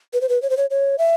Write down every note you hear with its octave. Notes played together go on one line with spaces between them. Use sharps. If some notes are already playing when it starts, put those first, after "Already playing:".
B4
C5
B4
C#5
C5
C#5
C#5
E5